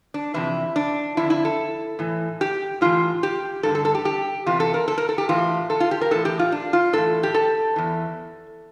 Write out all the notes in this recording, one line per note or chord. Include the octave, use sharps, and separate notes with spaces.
D4
F2 C3 E3 E4
D4
F2 D3 E4
E4
A4
A2 E3
G4
A2 E3 F4
G4
G2 D3 A4
A4
A4
G4
G4
E2 C3 E3 F4
A4
A#4
A4
A#4
A4
G4
A2 E3 F4
A4
F4
G4
A#4
A2 E3 A4
G4
F4
D4
F4
A2 E3 A4
G4
A4
E2 E3